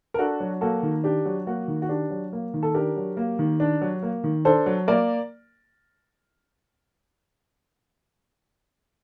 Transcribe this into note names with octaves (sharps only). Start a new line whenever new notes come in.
A#4
D4 F#4 A4
F#3
A#3 F#4 A4
D#3
D4 G4
F#3
A#3 F#4
D#3
F#4
D4 G4
F#3
A#3
D#3
A4
D4 G4 A#4
F#3
A#3
D#3
D4
F#3
A#3
D#3
D4 A4 C5
F#3
A#3 A#4 D5